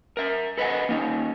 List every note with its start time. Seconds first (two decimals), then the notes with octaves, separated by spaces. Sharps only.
0.17 A#4 E5
0.58 A4 B4 D#5 F5 F#5 G#5
0.89 A#3 C#4 D#4